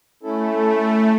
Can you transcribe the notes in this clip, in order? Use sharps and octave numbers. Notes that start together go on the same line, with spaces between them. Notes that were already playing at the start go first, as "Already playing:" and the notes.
A3 C#4 E4 A4